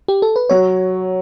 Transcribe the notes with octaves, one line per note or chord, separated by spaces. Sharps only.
G4
A4
B4
F#3 C#5